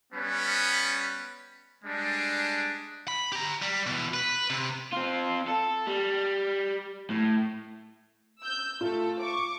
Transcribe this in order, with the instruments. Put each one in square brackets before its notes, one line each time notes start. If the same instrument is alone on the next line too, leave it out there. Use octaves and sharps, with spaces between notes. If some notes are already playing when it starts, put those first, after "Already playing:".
[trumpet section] G3 B3 C#4 B4
G3 G#3 D4
[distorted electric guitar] B5
G4 A#5
G3
B2 E3
B4
C3
[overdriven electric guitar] C4 F4
A4
G3
A2
[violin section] E6 G6
[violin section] A3 A4 [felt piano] F4
[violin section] C#6 D6